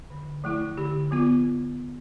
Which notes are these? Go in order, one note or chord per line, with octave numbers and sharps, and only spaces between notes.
D3
F3 A3 E4
D3 G4
F3 B3 F4